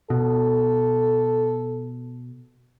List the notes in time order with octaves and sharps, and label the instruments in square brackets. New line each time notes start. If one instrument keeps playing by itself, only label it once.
[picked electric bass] B2 [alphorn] A4